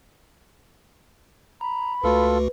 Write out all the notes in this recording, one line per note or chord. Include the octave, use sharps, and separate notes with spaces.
A#5 B5
C#2 A3 F4 F#4 A4 B4